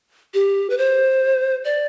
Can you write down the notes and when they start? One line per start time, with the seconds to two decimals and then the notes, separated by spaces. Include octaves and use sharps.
0.34 G4
0.70 B4
0.78 C5
1.65 D5